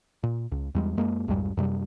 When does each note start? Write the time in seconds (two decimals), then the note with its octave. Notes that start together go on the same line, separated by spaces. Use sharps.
0.23 A#2
0.52 C#2
0.75 E2 G3 G#3
0.97 F#2 G#3 A#3
1.28 B1 F2 G#2 G3
1.57 F#2 C3 G3